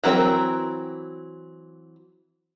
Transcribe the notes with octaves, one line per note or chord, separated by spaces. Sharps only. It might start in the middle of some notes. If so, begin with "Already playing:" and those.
E3 F#3 C4 A#4 G5